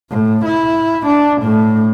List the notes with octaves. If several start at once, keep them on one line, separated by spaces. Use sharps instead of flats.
A2
E4
D4
A2